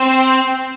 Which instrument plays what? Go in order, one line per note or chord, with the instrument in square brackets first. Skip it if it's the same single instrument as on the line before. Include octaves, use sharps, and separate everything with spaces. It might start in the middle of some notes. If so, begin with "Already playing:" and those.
Already playing: [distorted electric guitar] C4